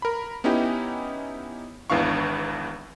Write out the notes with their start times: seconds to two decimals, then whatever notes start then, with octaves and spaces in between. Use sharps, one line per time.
0.02 A#4 B5
0.44 B3 C#4 D#4 E4 G4
1.90 G#1 E2 E3 D4 F5 C#6